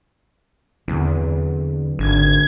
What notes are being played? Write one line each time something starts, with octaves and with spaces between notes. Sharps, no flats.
E2 D3 F#3 C4
G#1 D3 G#6